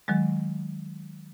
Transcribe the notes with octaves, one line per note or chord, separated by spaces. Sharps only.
D#3 F#3 G#3